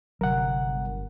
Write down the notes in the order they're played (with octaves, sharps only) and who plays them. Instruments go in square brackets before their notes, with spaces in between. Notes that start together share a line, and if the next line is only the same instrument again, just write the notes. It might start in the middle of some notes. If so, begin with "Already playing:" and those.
[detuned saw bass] G1 [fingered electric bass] C3 F#3 [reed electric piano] A#4 F#5